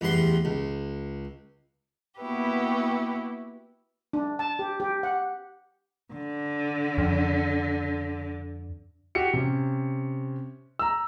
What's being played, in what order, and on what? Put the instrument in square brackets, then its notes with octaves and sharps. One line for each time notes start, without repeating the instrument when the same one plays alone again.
[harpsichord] A1 E2 G3 C6
C#2
[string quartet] A#3 B3 E4 F#4 G4 B4
[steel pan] D4
A5
G4
G4
F#5
[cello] D3
[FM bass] F2
[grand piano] F#4 G4 C#7
C3 C#4
A#5 E6